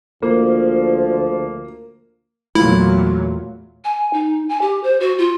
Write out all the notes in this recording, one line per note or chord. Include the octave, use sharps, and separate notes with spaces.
D2 F3 A#3
E2 A#2 F#3 A3 E4 F4
G#5
D#4
G#5
G4
C5
F#4
F4